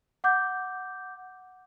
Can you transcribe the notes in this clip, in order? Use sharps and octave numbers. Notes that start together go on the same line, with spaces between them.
F#5 D6 G6